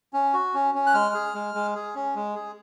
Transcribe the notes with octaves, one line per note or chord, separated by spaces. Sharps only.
C#4
F#4
C#4
C#4
F#6
G#3 F6
G#4
G#3
G#3
G#4
C#4
G#3
G#4